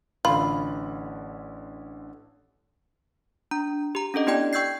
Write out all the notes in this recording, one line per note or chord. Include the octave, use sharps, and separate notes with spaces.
A1 D3 F4 B5
D4 A#5
G4 A#5
C#4 D4 A4 D#5
B3 E4 G4 D5 G5 G#6
G5 C#6 E6 G6 G#6 C7